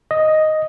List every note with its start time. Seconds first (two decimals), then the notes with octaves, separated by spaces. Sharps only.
0.11 D#5